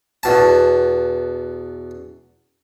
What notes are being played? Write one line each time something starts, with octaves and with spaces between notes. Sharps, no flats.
E2 B2 A5